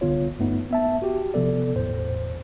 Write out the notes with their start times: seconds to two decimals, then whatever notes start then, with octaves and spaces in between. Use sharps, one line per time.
0.01 C2 D3 B3 F4 C#5
0.39 G2 A3 B3 D#4
0.71 B3 E5 A5
1.02 F#4 G4
1.34 C3 F3 B3 A4 D5
1.76 G1 E2 A2 C5